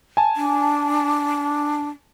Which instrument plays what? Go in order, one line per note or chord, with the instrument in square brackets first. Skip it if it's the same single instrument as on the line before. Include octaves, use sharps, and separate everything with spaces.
[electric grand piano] G#5 A5
[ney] D4